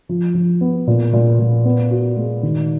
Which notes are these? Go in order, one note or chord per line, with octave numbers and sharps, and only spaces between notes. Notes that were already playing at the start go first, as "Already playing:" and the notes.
F3
F3
B3
A#2
A#2
A#2
B3
F#4
G#3
D#3